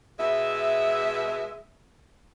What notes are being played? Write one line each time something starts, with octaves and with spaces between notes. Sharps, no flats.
B2 G#3 E5